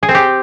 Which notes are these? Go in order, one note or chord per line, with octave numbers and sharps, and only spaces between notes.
G#4
C4
G4